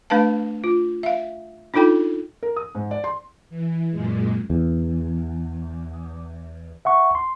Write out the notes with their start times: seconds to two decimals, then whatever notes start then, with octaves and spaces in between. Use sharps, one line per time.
0.10 A3 D4 B4 F5 A5
0.64 F4
1.03 E5 F5
1.74 D4 D#4 F4 A4 G5
2.43 A#4
2.56 D#6
2.75 G#2
2.91 D5
3.04 C6
3.50 E3
3.91 F#2 A#2 G#3
4.50 E2
6.85 E5 F#5 C#6
7.15 C6